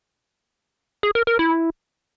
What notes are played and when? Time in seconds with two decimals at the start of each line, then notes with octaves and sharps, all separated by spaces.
1.03 G#4
1.15 A#4
1.27 A#4
1.39 E4